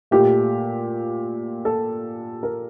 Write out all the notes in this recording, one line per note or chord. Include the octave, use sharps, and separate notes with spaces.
A#2 A3 G4
A4
A#4